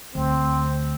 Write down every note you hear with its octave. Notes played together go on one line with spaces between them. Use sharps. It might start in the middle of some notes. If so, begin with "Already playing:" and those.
D2 C4